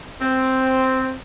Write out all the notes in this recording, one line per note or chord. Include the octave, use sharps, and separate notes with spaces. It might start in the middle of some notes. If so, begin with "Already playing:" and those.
C4